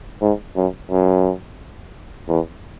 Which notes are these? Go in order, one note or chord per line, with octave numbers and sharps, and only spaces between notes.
G#2
F#2
F#2
E2